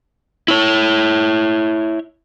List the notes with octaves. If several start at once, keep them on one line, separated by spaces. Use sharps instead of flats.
E4 C#5